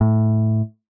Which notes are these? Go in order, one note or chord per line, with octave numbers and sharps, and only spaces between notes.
A2